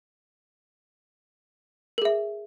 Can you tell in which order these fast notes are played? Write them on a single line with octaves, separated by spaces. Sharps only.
A#4 G#4 E5